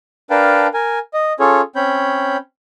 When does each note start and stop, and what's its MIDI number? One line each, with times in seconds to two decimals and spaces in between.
0.30 0.67 62
0.30 0.67 70
0.30 0.67 71
0.30 0.67 77
0.30 0.67 79
0.30 0.67 81
0.74 0.99 70
0.74 0.99 80
1.14 1.33 75
1.40 1.61 61
1.40 1.61 65
1.40 1.61 68
1.40 1.61 69
1.40 1.61 73
1.76 2.37 60
1.76 2.37 61
1.76 2.37 73
1.76 2.37 83
1.76 2.37 91